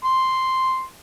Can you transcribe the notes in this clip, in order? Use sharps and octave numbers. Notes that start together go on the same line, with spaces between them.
C6